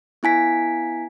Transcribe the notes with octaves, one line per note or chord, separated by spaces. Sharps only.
B3 E4 G#5 B6